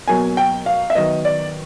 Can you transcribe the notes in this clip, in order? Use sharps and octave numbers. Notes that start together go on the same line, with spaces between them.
B2 F#3 A#3 G#5
G5
F5
E5
D#3 F#3 B3 D#5
D5